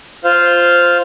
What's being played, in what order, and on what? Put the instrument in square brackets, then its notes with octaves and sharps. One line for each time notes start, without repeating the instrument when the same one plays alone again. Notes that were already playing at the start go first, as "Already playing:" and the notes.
[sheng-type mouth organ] F4 C5 F5